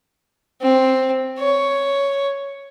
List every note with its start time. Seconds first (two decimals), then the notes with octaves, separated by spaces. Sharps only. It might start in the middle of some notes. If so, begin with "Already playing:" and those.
0.61 C4
1.38 C#5